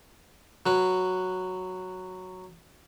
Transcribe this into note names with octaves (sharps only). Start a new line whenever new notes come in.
F#3 B4